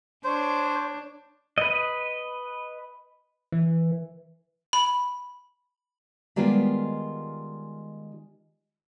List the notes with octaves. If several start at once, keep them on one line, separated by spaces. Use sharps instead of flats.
D4 C5 C#5
B4 D#5
E3
B5
D#3 G3 G#3 B3 F4 D5